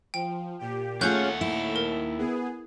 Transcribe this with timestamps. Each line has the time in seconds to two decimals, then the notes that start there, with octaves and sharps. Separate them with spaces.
0.14 F3 G5
0.59 A#2 G4
1.01 D#2 A3 C#4 F4 G#4 F#5 F#6 G6
1.41 E4
1.76 A#4
2.18 B3 G#4